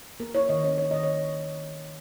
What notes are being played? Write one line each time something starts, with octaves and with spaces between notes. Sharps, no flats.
A#3 A#4
E4 C#5
D#3 D#5
C#4 C#5
E4 C#5
D#3 D#5
C#5